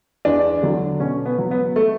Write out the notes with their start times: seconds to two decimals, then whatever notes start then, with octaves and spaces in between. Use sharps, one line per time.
0.25 E2 D4
0.63 D3 F#3
1.00 B2 C#4
1.25 B3
1.38 F#3
1.51 B3
1.76 A3